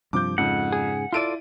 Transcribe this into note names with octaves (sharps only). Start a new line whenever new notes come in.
G2 C3 F3 D6 G6
F2 G#2 C#3 F#5
G#4
E4 F4 A4 D5 D7 D#7